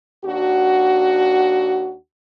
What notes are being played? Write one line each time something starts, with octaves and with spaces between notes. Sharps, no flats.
D#2 D4 F#4